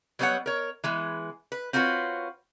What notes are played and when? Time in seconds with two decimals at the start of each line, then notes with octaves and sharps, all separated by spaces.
0.19 F#3 G3 B3 G#4 C#5 F#5
0.46 A#4 C#5
0.84 E3 G#3 B3
1.52 B4
1.73 C4 F4 F#4 A4 B4 C#5